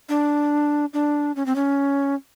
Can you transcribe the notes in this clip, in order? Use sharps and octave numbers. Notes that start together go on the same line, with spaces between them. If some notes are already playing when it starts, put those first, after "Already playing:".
D4
D4
C#4
C4
C#4